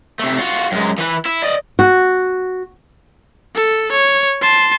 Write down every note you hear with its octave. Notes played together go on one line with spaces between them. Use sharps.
C3 A3
F4 F#4
F#2 G#3
E3 B4
E4
D5 D#5
F#4
A4
C#5
A5 C6